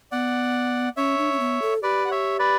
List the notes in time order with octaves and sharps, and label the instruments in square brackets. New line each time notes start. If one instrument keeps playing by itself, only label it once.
[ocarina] B3 [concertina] D5 F#5
[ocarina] C#4 [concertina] C#5 E5
[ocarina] D4
C#4
B3
A4
[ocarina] G4 [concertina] B4 D5
[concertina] F#5
C#5 E5
B4 D5